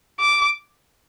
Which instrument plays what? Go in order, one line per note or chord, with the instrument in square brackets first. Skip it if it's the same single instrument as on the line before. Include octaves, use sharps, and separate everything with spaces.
[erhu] D6